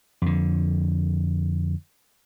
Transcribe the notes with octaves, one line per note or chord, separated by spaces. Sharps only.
F2 D3